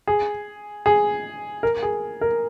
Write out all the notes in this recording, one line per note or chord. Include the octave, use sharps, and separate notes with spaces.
G#4
G#4
A#4
G#4
A#4